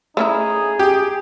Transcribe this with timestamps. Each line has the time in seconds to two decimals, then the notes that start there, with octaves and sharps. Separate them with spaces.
0.17 A3 C#4 D#4 E4 G#4
0.79 G4